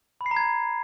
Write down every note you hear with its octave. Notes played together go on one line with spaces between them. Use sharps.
B5
C7
A#5
G#6